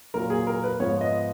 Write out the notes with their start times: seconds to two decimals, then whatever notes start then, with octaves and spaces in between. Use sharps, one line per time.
0.14 A#2 F#3 A#3 A#4
0.30 G#4
0.47 A#4
0.64 B4
0.80 G#2 F3 B3 C#5
1.01 D#5